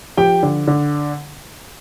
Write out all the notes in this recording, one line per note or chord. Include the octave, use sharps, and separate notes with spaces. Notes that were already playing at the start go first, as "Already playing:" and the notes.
F3 G4 G5
D3
D3